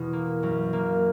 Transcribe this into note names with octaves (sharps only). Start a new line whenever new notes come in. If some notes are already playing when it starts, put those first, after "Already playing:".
Already playing: E2 B2
A#3
F#2
A#3